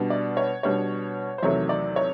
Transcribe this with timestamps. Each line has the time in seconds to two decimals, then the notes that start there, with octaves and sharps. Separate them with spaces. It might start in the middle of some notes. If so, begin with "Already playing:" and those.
Already playing: B2 G3 B3 D4
0.10 D5
0.37 C#5
0.63 B2 G3 B3 D4 C#5
1.38 C5
1.43 E2 C3 D#3 F#3 A3 C#5
1.69 D5
1.96 C#5